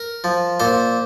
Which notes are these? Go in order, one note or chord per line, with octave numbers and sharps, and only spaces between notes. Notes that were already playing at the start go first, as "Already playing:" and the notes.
Already playing: A#4
F3
A#2 C5